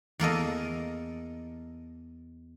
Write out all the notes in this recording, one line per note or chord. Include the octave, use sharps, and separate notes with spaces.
E2 A#3 A4 D#5